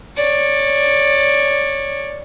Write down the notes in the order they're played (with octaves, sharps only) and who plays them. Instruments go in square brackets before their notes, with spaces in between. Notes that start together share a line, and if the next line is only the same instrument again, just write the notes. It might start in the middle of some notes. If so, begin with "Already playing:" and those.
[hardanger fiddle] C#5 D5